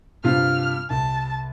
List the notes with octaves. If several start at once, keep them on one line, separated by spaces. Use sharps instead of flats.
G2 C3 F4 F6
C2 A5